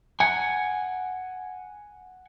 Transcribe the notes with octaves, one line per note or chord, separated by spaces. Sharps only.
F#5 G#5